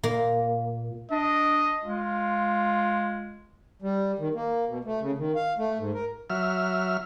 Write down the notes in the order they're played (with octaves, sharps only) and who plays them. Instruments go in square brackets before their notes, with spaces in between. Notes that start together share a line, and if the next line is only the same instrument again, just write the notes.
[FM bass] A#2 [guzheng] A#3
[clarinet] D4 [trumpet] D#5
[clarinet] G#3 [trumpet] F4
[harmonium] G3
D#3
A#3
B2
A3
C#3
D#3
F5
A3
G#2
A#4
[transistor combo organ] F#3 E5 F6